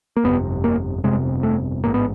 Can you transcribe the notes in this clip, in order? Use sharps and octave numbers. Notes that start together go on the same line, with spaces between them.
A#3
G1 F2 C3 B3
A#3
G1 F2 C3 G#3
A3
A1 G#2 A#3
B3